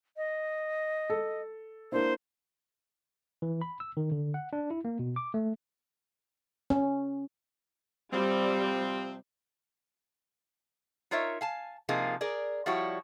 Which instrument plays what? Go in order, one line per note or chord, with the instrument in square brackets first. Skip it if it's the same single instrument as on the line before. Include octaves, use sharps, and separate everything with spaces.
[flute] D#5
[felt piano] A4
[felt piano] A#3 D4 E4 [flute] C5
[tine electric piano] E3
B5
E6
D#3
D3
F#5
D4
E4
A#3
B2
D6
A3
[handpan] C#4
[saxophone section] C3 F3 C4 [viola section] G3
[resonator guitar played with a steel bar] D#4 F4 A#4 C#5 E5
F5 G#5 A5
C3 F3 A#3 D#4 F4 G#4
G#4 A#4 D5
F3 G3 E4 F#4 C#5